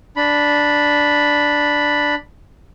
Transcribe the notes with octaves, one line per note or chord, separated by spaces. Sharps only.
D4 B5